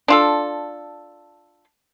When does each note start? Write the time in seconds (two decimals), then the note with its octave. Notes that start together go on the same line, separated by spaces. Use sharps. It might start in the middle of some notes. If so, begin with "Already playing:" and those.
0.08 D4 F4 A4